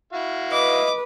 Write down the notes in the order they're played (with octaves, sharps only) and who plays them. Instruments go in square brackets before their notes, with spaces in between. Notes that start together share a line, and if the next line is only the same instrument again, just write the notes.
[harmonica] E4 F#4 F5
[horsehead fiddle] B4 [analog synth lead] D#5 [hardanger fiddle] D6